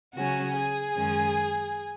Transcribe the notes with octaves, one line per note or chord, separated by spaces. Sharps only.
C#3 F#3 C#4 F#4
G#4
F#2 D#3 G#3 C#4